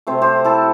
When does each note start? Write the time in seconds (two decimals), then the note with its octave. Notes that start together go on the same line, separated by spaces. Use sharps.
0.07 C3 A3 C4 C5
0.21 G4 C5
0.45 E4 A4